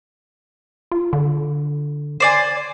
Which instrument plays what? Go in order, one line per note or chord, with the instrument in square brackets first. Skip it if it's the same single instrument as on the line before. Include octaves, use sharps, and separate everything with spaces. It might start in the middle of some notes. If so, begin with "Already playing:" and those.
[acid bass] F4
D3
[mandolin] C5 D5 G#5